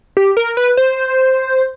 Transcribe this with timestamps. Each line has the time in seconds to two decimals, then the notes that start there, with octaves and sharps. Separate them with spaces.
0.17 G4
0.37 A#4
0.57 B4
0.77 C5